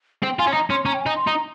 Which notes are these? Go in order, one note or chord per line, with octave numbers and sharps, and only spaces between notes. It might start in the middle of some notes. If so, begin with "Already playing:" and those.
C4 G5
F4 G#5
C#4
D#4 A#5
C#4 C6
C#4 A#5
G5
D#4 G#5
C6
D#4
A#5